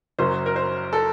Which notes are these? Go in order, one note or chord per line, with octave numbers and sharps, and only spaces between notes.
F#1 F#2 F#3 C5
A#4
C5
A4